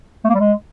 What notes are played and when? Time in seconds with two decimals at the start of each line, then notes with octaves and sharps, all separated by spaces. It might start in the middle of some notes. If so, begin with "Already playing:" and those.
0.24 A3
0.30 A#3
0.35 G3
0.40 G#3